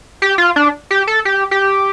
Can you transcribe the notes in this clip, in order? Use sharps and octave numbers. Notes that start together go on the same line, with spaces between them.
G4
F4
D4
G4
A4
G4
G4